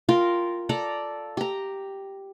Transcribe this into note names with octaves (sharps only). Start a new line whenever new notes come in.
F4 A#4 G5
A4 D5 A#5
G4 A#5